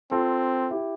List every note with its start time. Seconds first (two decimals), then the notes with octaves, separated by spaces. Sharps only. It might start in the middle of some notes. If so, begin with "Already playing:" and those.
0.11 C4 F4 A4
0.70 E4 G4